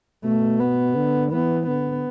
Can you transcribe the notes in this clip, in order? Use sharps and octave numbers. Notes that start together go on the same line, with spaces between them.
B2 A3
B3
D3
E3 B3
D3 B3